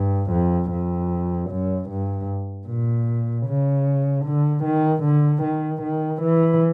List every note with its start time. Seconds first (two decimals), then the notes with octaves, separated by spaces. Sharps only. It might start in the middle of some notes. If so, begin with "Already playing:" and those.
Already playing: G2
0.31 F2
0.71 F2
1.50 F#2
1.90 G2
2.67 A#2
3.47 C#3
4.25 D3
4.64 D#3
5.04 D3
5.43 D#3
5.83 D#3
6.23 E3